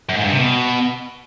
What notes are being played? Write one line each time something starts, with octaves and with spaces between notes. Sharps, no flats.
F#2
G#2
G2
C3
B2